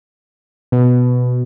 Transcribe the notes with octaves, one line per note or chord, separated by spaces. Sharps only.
B2